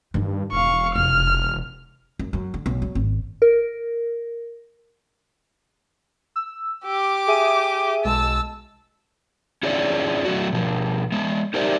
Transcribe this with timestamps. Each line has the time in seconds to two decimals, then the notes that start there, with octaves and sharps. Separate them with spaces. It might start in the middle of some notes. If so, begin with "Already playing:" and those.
0.14 G2 D#3 D4
0.52 E1 F5 C#6
0.95 F1 F6
2.19 F#2
2.33 F#2
2.54 D3
2.66 B1
2.82 F#3
2.95 G#1
3.42 A#4
6.36 E6
6.85 G4 D6
7.27 G#4 E5 D#7
8.04 B1 G#3 A5 E6
9.63 C#4 E4 F4 G#4 C#5 D5
10.25 F#3 A3 F#4
10.53 B2 F3
11.12 G#3 B3
11.54 D#4 G4 A#4 C5 D5 E5